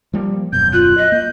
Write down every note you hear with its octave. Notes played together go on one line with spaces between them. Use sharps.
F3 G3 A#3
D#1 F#2 B2 G6
F4 F#6
D#5
A#3 G6